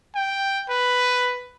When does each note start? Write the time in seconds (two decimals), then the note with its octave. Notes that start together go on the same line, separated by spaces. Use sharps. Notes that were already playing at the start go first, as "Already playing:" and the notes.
0.15 G5
0.69 B4